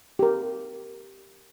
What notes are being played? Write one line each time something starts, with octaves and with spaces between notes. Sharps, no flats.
G4 A#4